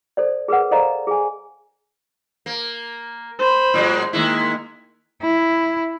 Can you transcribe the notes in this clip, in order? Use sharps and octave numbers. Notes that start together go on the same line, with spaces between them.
A4 C5 D5
G#4 A#4 B4 F#5
A4 C5 D5 D#5 F5 A#5
G#4 G#5
A#3
C5 B5
A2 F#3 G#3
D#3 G#3 A#3 E4
E4